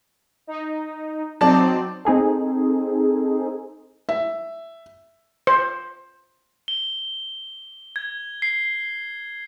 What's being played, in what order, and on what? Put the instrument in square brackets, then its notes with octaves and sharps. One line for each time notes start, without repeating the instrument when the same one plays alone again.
[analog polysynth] D#4
[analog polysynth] F#3 C4 D#4 [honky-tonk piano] D5 A5
[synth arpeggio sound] C4 D#4 G#4 A4
[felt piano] E5
[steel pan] C5
[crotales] G7
G#6
C7